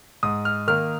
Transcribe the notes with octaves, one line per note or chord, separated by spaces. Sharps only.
G#2 D#6
F6
D#3 A#3 F6